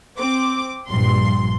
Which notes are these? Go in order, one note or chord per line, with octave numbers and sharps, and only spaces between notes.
C4 D6
A#1 G2 C6